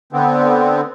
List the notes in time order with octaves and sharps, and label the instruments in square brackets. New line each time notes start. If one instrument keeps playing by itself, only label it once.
[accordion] D3 B3 C4